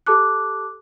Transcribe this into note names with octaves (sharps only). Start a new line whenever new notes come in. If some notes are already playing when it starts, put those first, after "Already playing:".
G4 A4 A5 D6 F#6